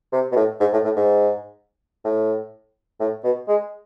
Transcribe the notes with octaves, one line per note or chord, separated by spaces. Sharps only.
C3
B2
A2
G#2
A2
A2
G#2
A2
A2
B2
G#3